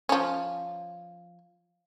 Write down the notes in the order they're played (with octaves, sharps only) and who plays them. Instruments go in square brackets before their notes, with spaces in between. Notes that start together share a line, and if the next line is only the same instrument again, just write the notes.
[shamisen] F3 C#4